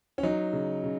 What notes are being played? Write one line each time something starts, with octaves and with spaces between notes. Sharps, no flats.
C#4
F#3 D#4
C#3
C#3